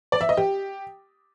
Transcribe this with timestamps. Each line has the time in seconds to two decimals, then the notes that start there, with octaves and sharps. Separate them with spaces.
0.12 D5
0.21 E5
0.29 D#5
0.37 G4